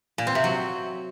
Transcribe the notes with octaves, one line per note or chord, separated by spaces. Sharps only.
A#2
C4
C3
F#3